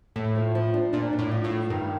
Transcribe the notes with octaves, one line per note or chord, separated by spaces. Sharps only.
A2 A3
F3
F3
D4
A#2 D4
D4
A2
F3
A2
F3
G2 D#3